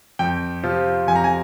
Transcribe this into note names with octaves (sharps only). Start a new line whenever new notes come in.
F2 G5
C3 F3 C4 F4
F2 G#5
A#5
G#5